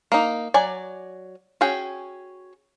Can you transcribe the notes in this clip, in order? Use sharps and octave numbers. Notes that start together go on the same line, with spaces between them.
A#3 D#4
F#3 D5 G#5
C#4 F#4 G#4 G5